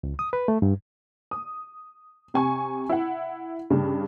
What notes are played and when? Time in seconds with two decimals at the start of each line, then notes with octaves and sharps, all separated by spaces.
0.03 C#2
0.19 D#6
0.33 B4
0.48 A3
0.62 G2
1.31 D#6
2.34 C3 G#5 C#6
2.89 E4 F#5
3.70 G2 C#3